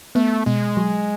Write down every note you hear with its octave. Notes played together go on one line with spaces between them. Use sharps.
A3 B3
B2 G#3
F#3